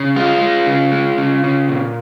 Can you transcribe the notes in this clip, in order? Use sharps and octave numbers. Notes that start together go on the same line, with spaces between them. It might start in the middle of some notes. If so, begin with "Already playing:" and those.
Already playing: C#3
G#3 F4
G#3
C#3
G#3
C#3
C#3
A#2